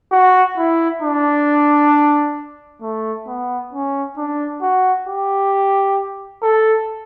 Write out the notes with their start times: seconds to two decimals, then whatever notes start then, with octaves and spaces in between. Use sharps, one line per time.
0.12 F#4
0.57 E4
1.02 D4
2.82 A3
3.27 B3
3.73 C#4
4.17 D4
4.62 F#4
5.08 G4
6.43 A4